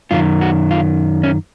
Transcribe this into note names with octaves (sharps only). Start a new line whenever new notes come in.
F#2 D#3 F4
F#4
F4
C#4